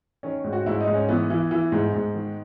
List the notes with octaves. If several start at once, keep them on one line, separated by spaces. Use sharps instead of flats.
D#3 C#4
G#2
F#4
G#2 E4
D#4
G#2
C#4
E3 B3
E3
E3
G#2
G#2
D#3